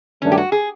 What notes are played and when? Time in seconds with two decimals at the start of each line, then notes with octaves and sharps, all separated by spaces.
0.22 G2 D#3 F#3 A3 C#4 D4
0.32 G4
0.38 F#4
0.52 G#4